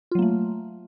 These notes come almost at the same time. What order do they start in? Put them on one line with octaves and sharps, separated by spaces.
F4 F#3 A#3 A3